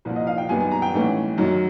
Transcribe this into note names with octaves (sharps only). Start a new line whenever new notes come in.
C2 A#2 F3
D#5
F5
G5
F#2 D#3 G3 B3 G#5
G#5
A#5
G5
A1 G#2 E3 A3 C#4
F#2 D#3 F#3